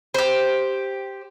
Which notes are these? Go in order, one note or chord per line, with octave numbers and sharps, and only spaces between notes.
G4 C5